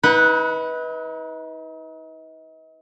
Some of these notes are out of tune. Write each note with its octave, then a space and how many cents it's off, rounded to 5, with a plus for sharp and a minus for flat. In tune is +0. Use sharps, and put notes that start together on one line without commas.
D#4 +40 B4 -10 F#5 +0